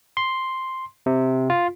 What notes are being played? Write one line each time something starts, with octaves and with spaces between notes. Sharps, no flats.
C6
C3
F4